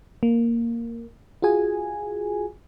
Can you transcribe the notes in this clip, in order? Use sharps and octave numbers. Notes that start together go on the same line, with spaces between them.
A#3
F4 F#4 G#4 G#5